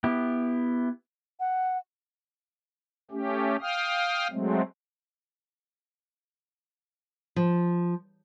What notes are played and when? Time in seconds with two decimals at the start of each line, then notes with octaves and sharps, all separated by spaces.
0.04 B3 E4 G4
1.40 F#5
3.11 A3 C#4 G4
3.61 F5 G5 D#6 F6
4.31 F#3 G#3 A3 C4
7.36 F3